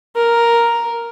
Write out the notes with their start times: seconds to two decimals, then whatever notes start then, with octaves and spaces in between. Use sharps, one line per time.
0.16 A#4